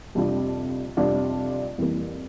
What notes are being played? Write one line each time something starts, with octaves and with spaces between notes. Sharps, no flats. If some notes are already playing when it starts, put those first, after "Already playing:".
F2 C3 G3 D4 F4
F2 C3 G3 D4 F4
F2 E3 G3 A#3